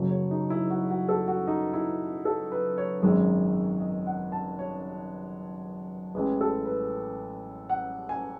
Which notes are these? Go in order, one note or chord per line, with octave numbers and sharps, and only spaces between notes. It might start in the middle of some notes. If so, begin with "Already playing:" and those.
Already playing: F#1 F#2 C#3 F#3
C#5
D#4
E4
F#4
F#4
A4
F#4
D#4
E4
A4
B4
C#5
G#1 F#2 D#3 G#3
D#5
F#5
A5
C#5
A1 A2 E3 G#3 B4
A4
B4
F#5
G#5